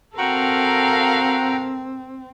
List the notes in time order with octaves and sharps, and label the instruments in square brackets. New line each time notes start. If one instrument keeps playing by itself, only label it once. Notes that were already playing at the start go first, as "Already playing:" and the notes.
[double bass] C4 [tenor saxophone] F#4 [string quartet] A4 A#4 F5 [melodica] G5 A#5